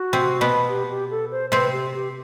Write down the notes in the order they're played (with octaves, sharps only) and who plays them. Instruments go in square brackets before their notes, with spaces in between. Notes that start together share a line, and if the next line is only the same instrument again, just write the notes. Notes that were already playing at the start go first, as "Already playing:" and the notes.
Already playing: [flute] F#4
[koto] C3 C4
B2 B3
[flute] G4
G4
A4
C5
[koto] C3 C4 [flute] B4
[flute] G4
G4